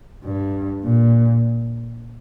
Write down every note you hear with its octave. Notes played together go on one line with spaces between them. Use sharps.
G2
A#2